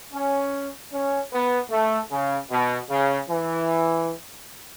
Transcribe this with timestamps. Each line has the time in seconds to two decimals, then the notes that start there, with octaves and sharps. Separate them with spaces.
0.13 C#4
0.92 C#4
1.32 B3
1.71 A3
2.11 C#3
2.50 B2
2.90 C#3
3.29 E3